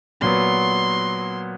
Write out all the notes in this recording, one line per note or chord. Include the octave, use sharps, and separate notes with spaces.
A#2 F#3 B3 C6